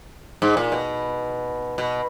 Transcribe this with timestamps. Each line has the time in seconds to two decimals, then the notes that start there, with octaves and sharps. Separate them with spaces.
0.42 G#2
0.57 A#2
0.72 B2
1.78 B2